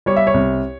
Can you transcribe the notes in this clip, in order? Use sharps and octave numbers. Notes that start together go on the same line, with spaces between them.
G3 C#5
E5
C#5
C2